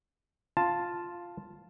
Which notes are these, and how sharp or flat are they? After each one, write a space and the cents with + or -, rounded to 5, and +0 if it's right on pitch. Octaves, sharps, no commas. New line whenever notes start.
F4 +0 A5 +0